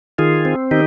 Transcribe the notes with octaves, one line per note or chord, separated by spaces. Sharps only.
D#3 F4 G#4
C4
D#3 D#4 G4